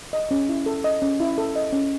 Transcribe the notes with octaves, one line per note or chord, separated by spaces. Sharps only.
D#5
C#4
E4
A4
D#5
C#4
E4
A4
D#5
C#4